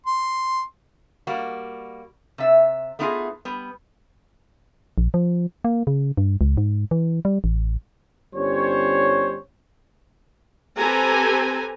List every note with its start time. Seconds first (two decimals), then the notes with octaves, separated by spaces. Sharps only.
0.06 C6
1.27 G3 A#3 F#4
2.38 C3 E5
2.99 A3 B3 D#4 F4 F#4 G#4
3.45 G3 B3
4.98 A#1
5.14 F3
5.65 A#3
5.87 C#3
6.17 G2
6.41 C#2
6.57 G#2
6.91 E3
7.25 G3
7.44 A1
8.35 G1 G3 C#4 C5 C#5
10.78 C4 G4 A4 B4 G#5 A#5